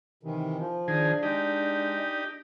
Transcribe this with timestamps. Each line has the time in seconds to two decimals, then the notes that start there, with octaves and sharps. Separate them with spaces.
0.23 C3 D#3 E3
0.58 F3
0.88 D#3 D4 G#4
1.23 G#3 D#4 G4